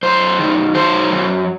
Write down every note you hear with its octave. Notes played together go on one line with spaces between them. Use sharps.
F#2 C5
D#3
F#3 C5
F#2